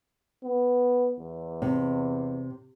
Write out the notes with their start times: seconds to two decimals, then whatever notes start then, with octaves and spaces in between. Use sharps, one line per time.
0.44 B3
1.19 E2
1.62 C3